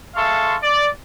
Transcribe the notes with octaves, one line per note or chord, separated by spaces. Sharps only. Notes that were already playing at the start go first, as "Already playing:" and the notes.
G#3 A4 E5 F5 C6 C#6
D5